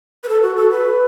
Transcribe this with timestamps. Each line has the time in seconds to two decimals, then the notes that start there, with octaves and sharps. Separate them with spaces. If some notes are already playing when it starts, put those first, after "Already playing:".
0.23 B4
0.29 A4
0.42 F#4
0.56 A4
0.70 B4